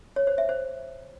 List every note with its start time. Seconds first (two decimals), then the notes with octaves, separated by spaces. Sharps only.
0.16 C#5
0.27 C5
0.38 E5
0.49 C5